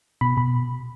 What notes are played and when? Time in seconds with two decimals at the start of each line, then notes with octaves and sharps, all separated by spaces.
0.21 B2 B5
0.37 B2 B5